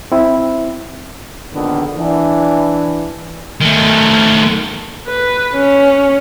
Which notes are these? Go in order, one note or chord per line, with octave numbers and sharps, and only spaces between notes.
C4 E4
A#1 D3 D#3 B3
E3 D4
D#3 A3
B4
C#4